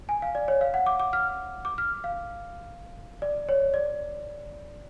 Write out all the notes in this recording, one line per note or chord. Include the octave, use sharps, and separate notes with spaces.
G#5
F5
D5
C#5
F5
F#5
D6
D6
F6
D6
F6
F5
D5
C#5
D5